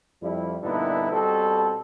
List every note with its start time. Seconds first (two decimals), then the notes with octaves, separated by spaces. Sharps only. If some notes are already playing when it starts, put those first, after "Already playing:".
0.21 F2 G3 E4
0.63 G2 A#2 D3 B3 D#4 E4
1.12 B2 G3 C4 A4